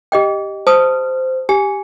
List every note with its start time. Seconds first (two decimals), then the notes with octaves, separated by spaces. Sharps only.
0.12 G4 D#5 G5
0.67 C5 A5 D#6
1.49 G4 G#5